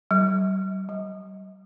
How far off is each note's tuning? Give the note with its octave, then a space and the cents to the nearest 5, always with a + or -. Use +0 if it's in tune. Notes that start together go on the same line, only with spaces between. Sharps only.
G3 -45
G3 -30